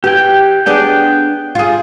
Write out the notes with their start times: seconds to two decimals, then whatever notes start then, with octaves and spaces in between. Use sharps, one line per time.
0.04 E3 G4 G5
0.66 B3 D4 G#4 G5
1.55 F4 G#4